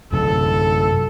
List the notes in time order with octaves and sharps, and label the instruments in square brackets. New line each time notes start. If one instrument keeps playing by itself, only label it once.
[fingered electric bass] F#2 C3 [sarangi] A4